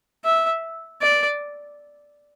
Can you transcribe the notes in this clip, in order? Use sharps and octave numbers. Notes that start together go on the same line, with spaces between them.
E5
D5